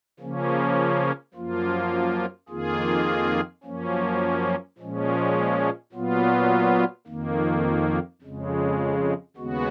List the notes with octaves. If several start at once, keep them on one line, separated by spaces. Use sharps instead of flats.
C#3 F3 A#3 C#4
F#2 F3 A#3 F4
F2 D#3 A#3 F4 G#4
F#2 F3 A#3 C#4
A#2 F3 G#3 C#4
A#2 F#3 B3 F4
F2 D#3 A#3
F2 C#3 G#3
D#2 C#3 G#3 B3 F#4